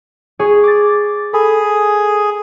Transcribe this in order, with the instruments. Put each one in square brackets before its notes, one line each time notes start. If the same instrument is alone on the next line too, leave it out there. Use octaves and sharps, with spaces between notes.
[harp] G#4 C#5 D#6
[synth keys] D6 A6
[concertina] G#4 [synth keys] A4 [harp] B5